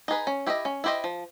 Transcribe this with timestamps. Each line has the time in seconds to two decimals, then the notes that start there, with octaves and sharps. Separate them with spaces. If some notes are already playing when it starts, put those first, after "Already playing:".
0.08 D#4 G#4 B4
0.27 C#4
0.47 E4 G4 C5 D#5
0.65 C#4
0.84 E4 G4 C5 D#5
1.04 F3